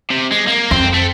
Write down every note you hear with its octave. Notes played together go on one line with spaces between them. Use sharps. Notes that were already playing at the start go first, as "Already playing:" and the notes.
C3
G#3
A#3
F2 C4
A3